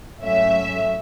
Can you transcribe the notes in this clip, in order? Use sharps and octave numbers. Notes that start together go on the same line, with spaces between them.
G#2 F#3 A3 C#4 E5